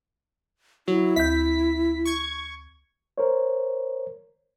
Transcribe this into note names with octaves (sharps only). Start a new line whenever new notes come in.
F#3 E4
D2 G6 B6
C#6 G#6
A#4 C5 C#5